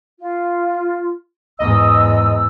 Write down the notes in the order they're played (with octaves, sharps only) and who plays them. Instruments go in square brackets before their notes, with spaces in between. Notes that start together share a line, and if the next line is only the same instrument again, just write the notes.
[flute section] F4
[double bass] E2 G#2 [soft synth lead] D#5 [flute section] E6